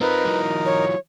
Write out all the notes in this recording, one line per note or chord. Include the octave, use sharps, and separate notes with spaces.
C4 D#4 F4 A#4 B4
E3 F#3
C#5